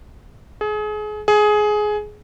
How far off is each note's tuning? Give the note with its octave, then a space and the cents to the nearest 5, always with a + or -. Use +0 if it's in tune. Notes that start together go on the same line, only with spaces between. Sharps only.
G#4 +30
G#4 +15